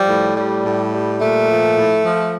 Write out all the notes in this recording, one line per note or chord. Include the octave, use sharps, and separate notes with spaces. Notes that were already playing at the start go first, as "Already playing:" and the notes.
Already playing: F3 G3
A2
G3
A2
G3
A#2 A3
F3
A2
F3